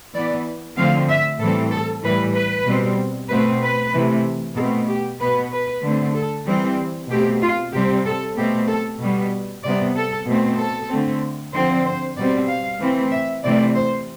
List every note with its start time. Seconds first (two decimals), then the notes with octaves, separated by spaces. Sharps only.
0.14 E3 B3 D5
0.77 D3 F3 A3 C4 F5
1.08 E5
1.40 A2 E3 G3 C4 A4
1.71 A4
2.03 A2 E3 G3 B4
2.35 B4
2.67 B2 G3 C4
3.30 B2 A3 C4 B4
3.62 B4
3.93 C3 E3 A3
4.56 B2 A3 C4 A4
4.88 G4
5.20 B2 B3 B4
5.52 B4
5.84 D3 A3 C4
6.16 A4
6.46 E3 G3 C4
7.10 B2 A3 C4 G4
7.42 F4
7.73 C3 G3 C4 G4
8.06 A4
8.37 B2 A3 C4 G4
8.68 A4
9.00 B2 G3 B3
9.63 C3 G3 B3 D5
9.96 A4
10.26 B2 A3 C4
10.58 A4
10.89 D3 A3 C4
11.53 D3 F3 C4 C5
11.85 C5
12.16 B2 G3 C4 D5
12.48 F5
12.79 E3 A3 C4
13.12 E5
13.43 C3 E3 A3 C4 D5
13.75 C5